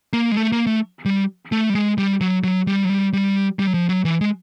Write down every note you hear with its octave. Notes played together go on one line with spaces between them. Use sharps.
A#3
G#3
A3
A#3
A3
G3
A3
G3
G#3
G3
F#3
F#3
G3
F#3
G3
G3
G3
F#3
F3
F#3
E3
G#3